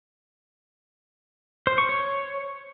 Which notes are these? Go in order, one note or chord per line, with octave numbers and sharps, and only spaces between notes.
C5
C#6
C#5